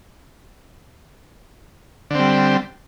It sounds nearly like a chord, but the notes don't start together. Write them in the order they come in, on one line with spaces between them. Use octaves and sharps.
D3 C4 G3